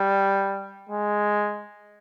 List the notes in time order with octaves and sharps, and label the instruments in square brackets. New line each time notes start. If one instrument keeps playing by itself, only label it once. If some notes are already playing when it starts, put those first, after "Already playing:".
Already playing: [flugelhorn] G3
G#3